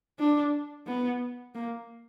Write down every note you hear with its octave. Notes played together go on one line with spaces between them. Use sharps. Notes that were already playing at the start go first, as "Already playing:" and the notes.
D4
B3
A#3